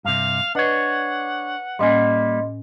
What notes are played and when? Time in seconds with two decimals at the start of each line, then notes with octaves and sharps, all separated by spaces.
0.05 G2 C3 F5
0.55 D4 B4 C#5 D#5 F#5
1.79 A2 G3 A#3 C#4 D#5 G#5 C6